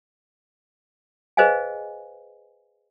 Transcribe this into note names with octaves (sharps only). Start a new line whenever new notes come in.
G#4 B4 C5 D#5 F5 G#5